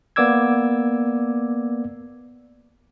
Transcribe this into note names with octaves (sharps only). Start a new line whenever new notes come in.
A#3 B3 D5 D6 E6 G#6